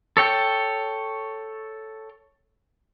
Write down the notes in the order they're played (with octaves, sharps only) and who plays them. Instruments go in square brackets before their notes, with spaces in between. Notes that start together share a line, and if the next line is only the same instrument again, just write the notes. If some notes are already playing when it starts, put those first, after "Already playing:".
[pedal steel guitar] A4 C#5 G5